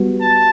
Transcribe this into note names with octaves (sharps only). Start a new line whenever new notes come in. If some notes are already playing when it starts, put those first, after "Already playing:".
Already playing: G3 B3 F#4
A5